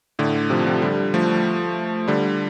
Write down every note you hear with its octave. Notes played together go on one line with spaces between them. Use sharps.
A2 D3
C3 F3
C3 F3
D3 G3
F3 A3
D3 G3